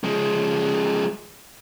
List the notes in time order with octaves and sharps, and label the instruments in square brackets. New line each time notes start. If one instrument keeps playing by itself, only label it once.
[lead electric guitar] F3 G#3